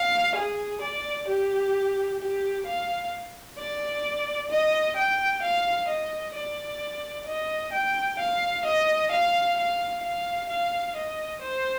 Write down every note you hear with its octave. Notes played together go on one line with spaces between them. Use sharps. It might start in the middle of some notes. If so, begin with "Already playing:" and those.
Already playing: F5
G#4
D5
G4
G4
F5
D5
D#5
G5
F5
D#5
D5
D#5
G5
F5
D#5
F5
F5
F5
F5
D#5
C5